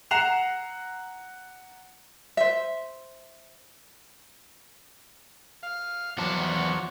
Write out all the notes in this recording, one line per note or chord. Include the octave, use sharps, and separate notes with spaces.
F#5 A#5 C7 E7 F7
C5 E5
F5
E2 F3 F#3 D4 A5 C#6